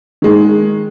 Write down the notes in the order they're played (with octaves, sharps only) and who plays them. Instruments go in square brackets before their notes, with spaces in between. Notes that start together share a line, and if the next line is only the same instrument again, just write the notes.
[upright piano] D#3 G#3